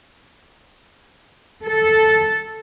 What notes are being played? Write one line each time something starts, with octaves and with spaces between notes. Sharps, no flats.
A4